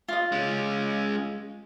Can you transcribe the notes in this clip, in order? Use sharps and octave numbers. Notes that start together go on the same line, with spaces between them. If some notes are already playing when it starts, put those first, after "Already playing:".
F4 D#5
G#3 C#4